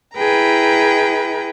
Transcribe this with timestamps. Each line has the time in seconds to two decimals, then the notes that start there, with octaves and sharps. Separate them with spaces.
0.16 E4 G#4 B4 G5 A#5